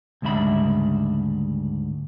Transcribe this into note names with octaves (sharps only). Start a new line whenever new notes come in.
D2 G#2 C#3 G3 E5 B5